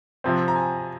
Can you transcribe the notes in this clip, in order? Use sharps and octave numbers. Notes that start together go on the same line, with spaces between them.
C3 F3 C4
A#5
G#5